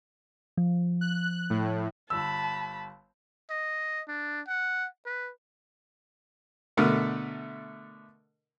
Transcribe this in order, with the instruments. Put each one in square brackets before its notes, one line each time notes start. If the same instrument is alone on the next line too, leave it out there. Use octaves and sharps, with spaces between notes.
[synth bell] F3
[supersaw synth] F#6
A2
[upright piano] G1 E6 [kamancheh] A5 B5
[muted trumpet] D#5
D4
F#5
B4
[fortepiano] B2 D3 A3 A#4